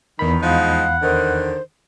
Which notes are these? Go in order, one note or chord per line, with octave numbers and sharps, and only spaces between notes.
E2 D#3 B5
F3 G#3 D#4 F5 F#5
D3 D#3 C5